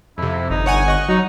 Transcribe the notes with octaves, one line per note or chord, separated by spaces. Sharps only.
F2 C3 E4
G1 D#4
C#5 F#5 G#5
D#5 F#5 C#6
F#3 D#4